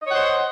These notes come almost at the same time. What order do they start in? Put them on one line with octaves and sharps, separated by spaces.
D#5 C#5 F#5 C5